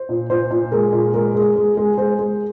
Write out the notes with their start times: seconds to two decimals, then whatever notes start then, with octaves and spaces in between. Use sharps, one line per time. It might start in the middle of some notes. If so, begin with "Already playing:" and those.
Already playing: C5
0.09 A#2
0.30 A#2 C5
0.51 A#2
0.71 G#3 A#4
0.93 A#2
1.14 G#3 A#4
1.35 G#3
1.56 G#3
1.77 G#3
1.97 G#3 C5
2.19 G#3